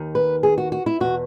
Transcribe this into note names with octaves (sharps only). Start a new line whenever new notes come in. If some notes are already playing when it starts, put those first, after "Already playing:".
Already playing: D#2 D#3
B4
G#4
F#4
F#4
E4
E2 B2 F#4